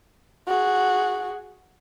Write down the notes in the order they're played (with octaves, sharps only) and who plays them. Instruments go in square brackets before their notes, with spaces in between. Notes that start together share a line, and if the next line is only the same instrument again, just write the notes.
[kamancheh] F#4 G#4